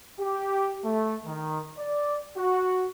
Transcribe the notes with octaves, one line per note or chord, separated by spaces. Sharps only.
G4
A3
D#3
D5
F#4